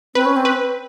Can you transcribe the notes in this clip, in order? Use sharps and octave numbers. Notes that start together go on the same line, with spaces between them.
C4 B4
C#4
C4
B4